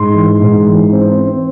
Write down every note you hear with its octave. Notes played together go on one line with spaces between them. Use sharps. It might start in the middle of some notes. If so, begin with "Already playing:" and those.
Already playing: G#2 C6
E3
G#2
E3
C4
C4